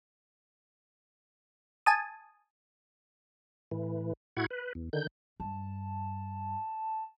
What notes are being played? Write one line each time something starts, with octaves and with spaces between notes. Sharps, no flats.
G#5 A5 D#6
A2 E3
A2 E4 F#4 F#5 G#6
B4
E2
D3 D#3 G6
G2 A5